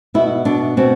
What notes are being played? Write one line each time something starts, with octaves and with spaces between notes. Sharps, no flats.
B2 E4
B2 D4
B2 C4